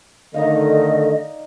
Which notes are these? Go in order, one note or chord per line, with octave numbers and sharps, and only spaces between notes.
D3 D#3 A3 D#4 D5 D#5 F5